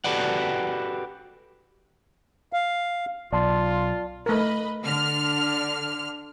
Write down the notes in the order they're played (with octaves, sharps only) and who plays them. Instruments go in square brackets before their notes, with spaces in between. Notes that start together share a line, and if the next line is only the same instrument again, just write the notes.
[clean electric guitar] F#4 G4 A4 B4 D5 F#5
[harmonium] F5
[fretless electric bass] B1 [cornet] F4 [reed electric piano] D5 A5 C6
[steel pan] A3 A#4 [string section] B4 D#5
[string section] D3 F6